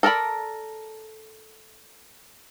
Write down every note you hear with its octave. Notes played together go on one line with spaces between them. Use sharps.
A4 A#4 D5 A#5 B5